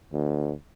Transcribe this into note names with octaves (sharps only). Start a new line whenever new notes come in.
D2